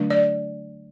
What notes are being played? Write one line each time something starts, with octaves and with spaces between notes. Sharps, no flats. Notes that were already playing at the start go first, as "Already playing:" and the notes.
Already playing: D3 F#3 A3 D4
D5